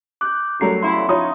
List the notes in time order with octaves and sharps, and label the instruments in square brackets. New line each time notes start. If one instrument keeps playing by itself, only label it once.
[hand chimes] D6 G6 [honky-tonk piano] F#6
[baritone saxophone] F#2 [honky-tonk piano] F#3 G3 A3 [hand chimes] C7
[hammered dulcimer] C#3 E3 B3 [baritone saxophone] E4 [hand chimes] C6
[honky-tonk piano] F3 C#5 D#6 [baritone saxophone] D#4